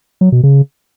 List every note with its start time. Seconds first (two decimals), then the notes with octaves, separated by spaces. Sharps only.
0.21 F#3
0.32 B2
0.43 C#3